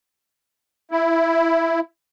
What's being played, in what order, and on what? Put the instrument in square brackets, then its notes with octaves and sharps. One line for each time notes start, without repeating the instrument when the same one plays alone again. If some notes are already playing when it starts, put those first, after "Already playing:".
[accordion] E4